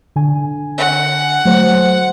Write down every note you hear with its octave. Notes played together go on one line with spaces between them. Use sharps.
D3 G#5
F#5
F#3 A3 C5